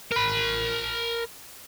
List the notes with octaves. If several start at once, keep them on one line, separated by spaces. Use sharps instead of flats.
A#4 B5